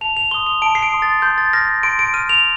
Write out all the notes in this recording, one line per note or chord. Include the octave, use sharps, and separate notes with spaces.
A5 F7
F7
C6 D#6 G7
F7
A5 D7
C7
D7
C6 D#6
A6
C6 G6
A6
F6 A#6
C6 D7
D7
F6 D#7
F7